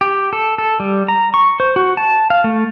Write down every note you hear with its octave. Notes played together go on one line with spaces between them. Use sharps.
G4
A4
A4
G3
A#5
C#6
C5
F#4
A5
F5
A3